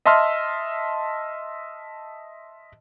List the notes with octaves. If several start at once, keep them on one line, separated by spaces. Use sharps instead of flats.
D#5 E5 A5 C6 E6 F6